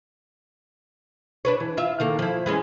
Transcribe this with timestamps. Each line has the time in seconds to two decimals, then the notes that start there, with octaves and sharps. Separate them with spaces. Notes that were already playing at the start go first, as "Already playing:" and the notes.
1.45 D4 B4 C#5
1.60 E3
1.77 F4 E5
2.00 D#3 A#3 A4
2.19 F3 E4
2.46 E3 G#3 C#4